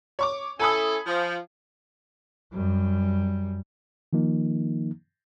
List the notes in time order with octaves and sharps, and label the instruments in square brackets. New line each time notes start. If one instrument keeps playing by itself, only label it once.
[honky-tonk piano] C#5 C#6 D6
[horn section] C#4 E4 A4 [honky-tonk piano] G#5 B5 D#6
[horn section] F3
[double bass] F#2 G3
[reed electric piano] D#3 F3 A#3 D#4